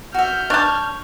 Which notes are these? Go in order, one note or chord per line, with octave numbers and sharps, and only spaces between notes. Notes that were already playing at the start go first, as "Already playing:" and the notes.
F#4 E5 F6 G6
D4 C#5 A5